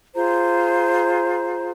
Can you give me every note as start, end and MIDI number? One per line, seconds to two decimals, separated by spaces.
0.15 1.71 65
0.15 1.71 68
0.15 1.71 72
0.15 1.71 82